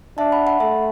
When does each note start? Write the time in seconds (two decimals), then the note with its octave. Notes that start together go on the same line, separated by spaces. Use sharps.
0.18 D4 E5 A5
0.32 F#5 B5
0.47 F#5 B5
0.60 A3 E5 A5